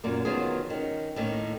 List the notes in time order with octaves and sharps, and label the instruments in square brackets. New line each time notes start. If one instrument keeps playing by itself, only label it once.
[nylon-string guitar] F#2 A#2 A#3
D#3 F3 F#3 B3 F4 G#4
D#3 C#4
A2 D#3 A#3 C#4